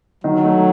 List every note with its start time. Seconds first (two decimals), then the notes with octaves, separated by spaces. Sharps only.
0.24 D#3 F#3
0.45 A3